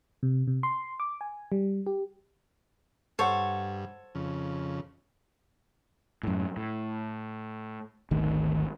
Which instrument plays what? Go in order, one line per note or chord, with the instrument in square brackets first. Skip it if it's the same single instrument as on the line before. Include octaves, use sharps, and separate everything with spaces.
[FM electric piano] C3
C3
C6
D6
G#5
G3
G4
[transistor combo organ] G2 [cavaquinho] A4 C#5 [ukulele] C5 F#5
[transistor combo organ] F2 C#3
[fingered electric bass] F#2 A2
A2
G#1 D2 D#3 A3